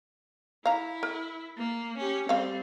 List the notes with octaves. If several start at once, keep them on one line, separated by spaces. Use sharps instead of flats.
E4 F5 A#5
A#4
A#3
C#4 G4
G3 C4 C5 F5